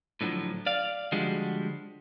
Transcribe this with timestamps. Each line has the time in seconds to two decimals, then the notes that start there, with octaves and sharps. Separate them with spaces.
0.21 A2 D3 F3 F#3
0.66 D5 F5
1.12 D3 F3 G3 G#3 F#4